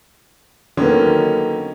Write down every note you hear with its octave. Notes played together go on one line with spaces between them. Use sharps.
D3 D#3 F#3 A#3 B3 C#4